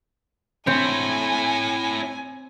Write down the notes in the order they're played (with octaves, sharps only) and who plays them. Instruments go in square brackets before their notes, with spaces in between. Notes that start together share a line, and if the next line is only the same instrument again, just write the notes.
[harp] C4 [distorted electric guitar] E4 C#5 [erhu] G#5